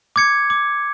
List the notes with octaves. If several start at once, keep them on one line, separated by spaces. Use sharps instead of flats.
D6 G#6 C#7
D6